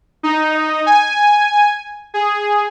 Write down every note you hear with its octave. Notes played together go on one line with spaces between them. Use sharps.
D#4
G#5
G#4